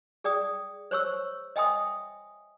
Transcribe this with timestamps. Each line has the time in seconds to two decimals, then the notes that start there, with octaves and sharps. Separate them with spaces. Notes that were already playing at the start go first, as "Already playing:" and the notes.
0.24 G#4 D5 G5 D#6
0.91 C5 C#5 C#6 E6
1.56 D#5 E5 G5 G#5 C6 D#6